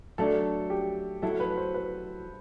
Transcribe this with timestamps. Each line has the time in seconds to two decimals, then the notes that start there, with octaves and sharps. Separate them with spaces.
0.18 F#3 A3 D4 A4
0.70 G4
1.22 F#3 A3 E4 A4
1.40 B4
1.57 C5
1.74 B4